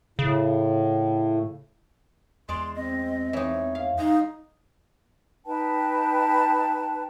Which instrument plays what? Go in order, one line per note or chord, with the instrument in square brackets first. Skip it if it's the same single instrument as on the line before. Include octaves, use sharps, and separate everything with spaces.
[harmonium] A2 [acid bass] C#3
[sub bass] E2 [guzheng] G#3 D5 [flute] C6
[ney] C4 [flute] D#5
[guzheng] E3 D#4 [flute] C#5
[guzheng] F5
[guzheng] G#3 A#5 [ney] D#4 [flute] F5
[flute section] D#4 B4 G5 A5